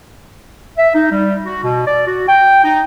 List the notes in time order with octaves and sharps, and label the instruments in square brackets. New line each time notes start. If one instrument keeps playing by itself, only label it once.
[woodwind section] E5
D#4
G3
F#4
B2
D5
F#4
G5
D#4